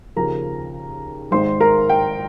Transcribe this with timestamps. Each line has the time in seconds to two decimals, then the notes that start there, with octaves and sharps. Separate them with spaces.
0.16 D#2 C#3 F3 A#4 A#5
1.31 G#1 G#2 D#3 C5 C6
1.60 A#4 A#5
1.89 G5